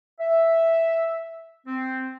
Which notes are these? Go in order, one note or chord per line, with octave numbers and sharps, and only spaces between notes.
E5
C4